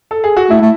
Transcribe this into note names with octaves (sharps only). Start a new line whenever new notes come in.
A4
G#4
F#4
A3 E4
A3